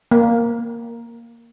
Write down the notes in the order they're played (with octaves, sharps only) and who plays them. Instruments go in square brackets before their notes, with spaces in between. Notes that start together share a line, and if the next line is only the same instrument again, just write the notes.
[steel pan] A#3